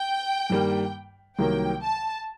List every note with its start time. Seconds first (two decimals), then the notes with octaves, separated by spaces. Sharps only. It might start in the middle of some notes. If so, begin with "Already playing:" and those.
Already playing: G5
0.50 G2 D#3 G3 A#3
1.38 C2 C3 D#3 F#3 A#3 G5
1.82 A5